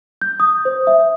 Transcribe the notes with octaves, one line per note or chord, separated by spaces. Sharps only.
G6
D#6
C5
E5